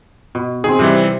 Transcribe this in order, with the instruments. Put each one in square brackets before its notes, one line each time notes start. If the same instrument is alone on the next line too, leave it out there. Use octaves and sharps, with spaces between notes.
[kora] B2
[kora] D#3 C4 [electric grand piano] G#4
[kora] C3 [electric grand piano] E3 G3 C4